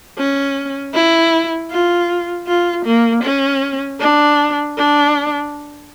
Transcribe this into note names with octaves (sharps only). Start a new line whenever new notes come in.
C#4
E4
F4
F4
A#3
C#4
D4
D4